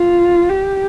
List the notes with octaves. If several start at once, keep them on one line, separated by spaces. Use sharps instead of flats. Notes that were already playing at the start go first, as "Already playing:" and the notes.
Already playing: F4
G4